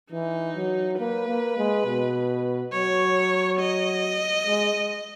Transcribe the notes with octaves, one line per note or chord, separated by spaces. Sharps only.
E3 D#4
F#3
A#3 B4
A#3
G#3
B2
F#3 C#5
D#5
G#3